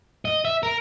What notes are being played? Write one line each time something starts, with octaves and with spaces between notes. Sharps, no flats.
D#5
E5
A#4